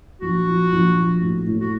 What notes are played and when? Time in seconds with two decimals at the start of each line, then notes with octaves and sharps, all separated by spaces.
0.21 A#1 F#4
0.47 F3
0.72 A#1
0.97 F3
1.21 A2
1.47 A2
1.60 F#4